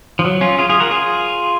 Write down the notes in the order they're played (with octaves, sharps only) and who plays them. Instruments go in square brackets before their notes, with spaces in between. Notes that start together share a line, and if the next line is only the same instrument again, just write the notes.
[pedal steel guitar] F3
F#3
C#4 F4
F4 G#4
F4 G#4
F#4 A#4
F4 G#4